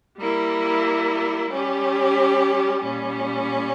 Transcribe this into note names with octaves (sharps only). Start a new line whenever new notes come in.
G3 A#3 E4
G3 C#4 G4
A#2 G3 C#4